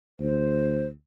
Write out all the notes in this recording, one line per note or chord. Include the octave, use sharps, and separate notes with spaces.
D2 C5